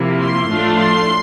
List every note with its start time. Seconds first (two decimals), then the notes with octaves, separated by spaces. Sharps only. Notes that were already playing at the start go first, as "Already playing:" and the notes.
Already playing: C3 F3 A#3 E4
0.20 C6
0.49 A2 F3 A3 D4 F4
0.77 C6